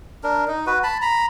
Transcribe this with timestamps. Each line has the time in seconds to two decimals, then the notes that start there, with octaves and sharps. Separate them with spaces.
0.24 D4 A#4
0.48 D#4
0.67 F#4 B4
0.83 A5 B5
1.02 A#5 B5